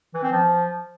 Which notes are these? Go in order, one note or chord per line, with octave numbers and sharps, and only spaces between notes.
E3
C4
F3